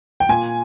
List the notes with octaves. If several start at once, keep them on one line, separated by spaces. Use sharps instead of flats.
G5
A#2 G#5